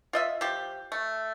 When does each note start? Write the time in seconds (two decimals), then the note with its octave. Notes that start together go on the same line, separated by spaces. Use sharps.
0.13 F4 D#5 E5
0.41 F3 G4
0.92 A3